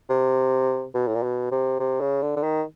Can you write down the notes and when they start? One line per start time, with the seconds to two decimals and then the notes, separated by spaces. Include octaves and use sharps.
0.10 C3
0.95 B2
1.08 A2
1.15 A#2
1.23 B2
1.51 C3
1.80 C3
2.01 C#3
2.22 D3
2.36 D3
2.43 D#3